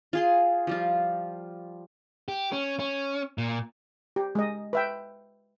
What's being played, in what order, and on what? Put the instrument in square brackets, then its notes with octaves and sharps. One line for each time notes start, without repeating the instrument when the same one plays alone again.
[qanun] F4 G#4 C6
F3 G3 F4
[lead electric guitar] G4
C#4
C#4
A#2
[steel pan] G4
G#3 D#5
B4 E5 G5